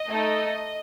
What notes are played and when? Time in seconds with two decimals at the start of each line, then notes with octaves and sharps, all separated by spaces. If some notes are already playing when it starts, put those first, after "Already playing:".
Already playing: D#5
0.09 A3 D#4 A4